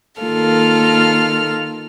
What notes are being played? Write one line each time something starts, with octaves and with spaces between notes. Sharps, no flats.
D#3 A#3 F4 A4 F6